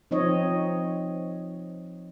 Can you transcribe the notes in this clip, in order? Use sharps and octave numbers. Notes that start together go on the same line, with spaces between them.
F3 C4 D#4 C#5 D#5